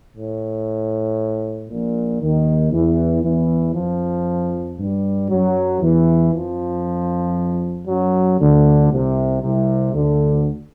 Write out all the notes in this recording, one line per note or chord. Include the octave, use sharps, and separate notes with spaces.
A2
A#1 A#2
D#2 D#3
E2 E3
E2 E3
F2 F3
G2 G3
F#2 F#3
E2 E3
F2 F3
F#2 F#3
D2 D3
C2 C3
C2 C3
D2 D3